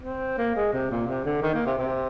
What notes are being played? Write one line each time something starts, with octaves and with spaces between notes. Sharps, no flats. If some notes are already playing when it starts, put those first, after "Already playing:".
C4
A#3
G#3
C3
A#2
C3
D3
D#3
A#3
C3
C3